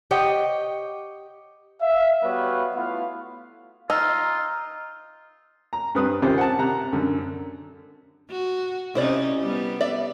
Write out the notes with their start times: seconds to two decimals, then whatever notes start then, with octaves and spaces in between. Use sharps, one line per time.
0.11 G4 C5 C#5 D#5 F#5 G5
1.81 E5 F5
2.24 G3 B3 F#4 B4 C#5 F5
2.74 A3 B3 E4 F4 F5
3.90 D#4 F4 A#5 E6
5.73 A#5
5.95 G2 C4 B4 D#6
6.22 C3 D#3 C#4 F4 G4 C5
6.38 F#5 A5
6.58 C3 A#5 F#6
6.93 F#2 D3
8.31 F#4
8.95 C3 C#4 D#4 E4 C5 D5
9.41 G3 B3
9.81 D5 E5